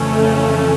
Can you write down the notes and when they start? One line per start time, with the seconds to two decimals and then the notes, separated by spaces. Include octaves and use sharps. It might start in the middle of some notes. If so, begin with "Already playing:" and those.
Already playing: F2 C#3 E3 A3 C#4